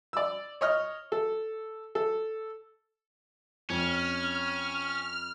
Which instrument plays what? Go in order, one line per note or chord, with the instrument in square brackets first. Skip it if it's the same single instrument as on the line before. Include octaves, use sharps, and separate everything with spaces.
[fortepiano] D5 E6
C#5 D#5 F6
A4
A4
[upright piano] F2 [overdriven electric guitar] C#4 [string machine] F6